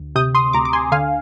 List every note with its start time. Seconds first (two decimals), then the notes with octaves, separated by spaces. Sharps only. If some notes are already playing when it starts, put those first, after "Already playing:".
Already playing: D2
0.15 C3 D#6 G6
0.35 C6 D#6
0.53 D2 A#5 D6
0.65 D6
0.73 G#5 C6
0.92 D3 F5 G#5